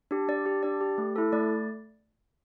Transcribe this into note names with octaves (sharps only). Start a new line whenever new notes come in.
D4 G4
D4 D5
G4
D4 D5
G4
A3
E4 A4
A3 D5